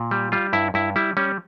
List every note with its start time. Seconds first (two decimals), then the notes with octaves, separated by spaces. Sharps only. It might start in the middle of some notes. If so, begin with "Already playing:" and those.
Already playing: A#2
0.11 G3
0.32 G3 F4
0.53 G2 E4
0.74 G2 E4
0.96 G3 E4
1.17 G3 C#4